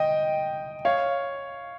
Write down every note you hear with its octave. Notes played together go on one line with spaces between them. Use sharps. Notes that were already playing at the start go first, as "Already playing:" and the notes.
Already playing: D#5 G5
C#5 F5